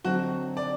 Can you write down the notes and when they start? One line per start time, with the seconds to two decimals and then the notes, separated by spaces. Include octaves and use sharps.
0.05 D3 F#3 C4 D#4 F#4
0.57 D5